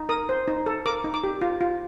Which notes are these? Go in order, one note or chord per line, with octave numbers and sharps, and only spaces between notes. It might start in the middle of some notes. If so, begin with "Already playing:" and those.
Already playing: D#4
A#4 D#6
C5
D#4
A4
A#4 D6
D#4
D6
G4
F4
F4